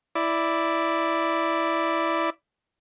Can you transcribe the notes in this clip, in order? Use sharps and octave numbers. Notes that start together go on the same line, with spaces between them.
E4 D5